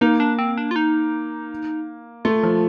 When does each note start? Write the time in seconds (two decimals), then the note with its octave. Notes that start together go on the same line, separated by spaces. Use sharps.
0.01 A#3 D#4
0.20 D4
0.39 C4
0.58 D4
0.71 F4
0.76 D#4
2.25 A3 F4
2.43 F3